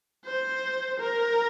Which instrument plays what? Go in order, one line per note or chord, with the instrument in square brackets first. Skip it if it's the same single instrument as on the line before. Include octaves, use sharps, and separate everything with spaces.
[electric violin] C5
A#4